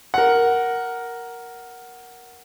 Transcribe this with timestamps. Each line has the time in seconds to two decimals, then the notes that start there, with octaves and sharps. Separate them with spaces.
0.14 A#4 F#5